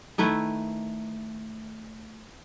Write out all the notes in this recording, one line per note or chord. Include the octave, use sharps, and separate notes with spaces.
D#3 A3 E4 B4